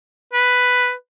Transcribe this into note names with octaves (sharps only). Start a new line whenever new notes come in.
B4